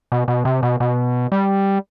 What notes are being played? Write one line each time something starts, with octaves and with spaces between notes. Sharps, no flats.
B2
B2
C3
B2
B2
G3